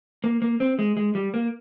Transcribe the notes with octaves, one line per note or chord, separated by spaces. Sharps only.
A#3
A#3
C4
G#3
G#3
G3
A#3